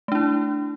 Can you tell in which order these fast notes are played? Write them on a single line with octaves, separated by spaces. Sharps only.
A3 D4 E4